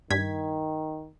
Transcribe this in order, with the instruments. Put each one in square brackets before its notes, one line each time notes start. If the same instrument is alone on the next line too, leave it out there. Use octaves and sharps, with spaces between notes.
[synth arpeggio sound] G2 G#6 B6 [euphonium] D#3